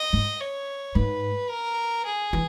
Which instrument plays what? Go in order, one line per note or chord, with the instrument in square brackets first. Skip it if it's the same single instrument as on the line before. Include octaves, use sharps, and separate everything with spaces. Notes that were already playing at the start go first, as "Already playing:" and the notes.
Already playing: [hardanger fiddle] D#5
[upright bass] G#2
[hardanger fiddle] C#5
[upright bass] G#2 [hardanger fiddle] B4
[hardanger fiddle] A#4
G#4
[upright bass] E3